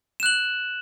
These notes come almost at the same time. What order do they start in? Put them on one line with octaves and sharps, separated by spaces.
E7 F#6 F#7